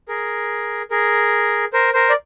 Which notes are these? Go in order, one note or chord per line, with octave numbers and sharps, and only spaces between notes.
G#4 A#4
G#4 A#4
A#4 C5
A#4 C5
D5